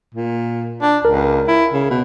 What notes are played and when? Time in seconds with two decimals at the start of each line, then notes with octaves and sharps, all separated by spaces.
0.14 A#2
0.82 D4
1.05 C#2 A#4
1.47 E4
1.73 C#3
1.90 B2